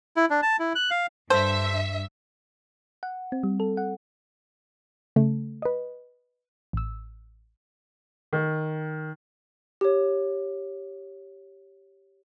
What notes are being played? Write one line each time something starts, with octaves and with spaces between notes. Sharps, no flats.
E4
D4
A5
E4
F#6
F5
G2 A4 C5 E5
F#5
C4
G3
A4
F#5
C#3 A3
B4 D#5
A1 E6
D#3
G4 C#5